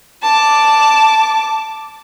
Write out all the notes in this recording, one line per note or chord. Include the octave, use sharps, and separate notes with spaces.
A5 D6